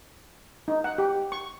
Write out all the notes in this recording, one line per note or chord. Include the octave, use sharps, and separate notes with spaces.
D#4
F#5
G4
C#6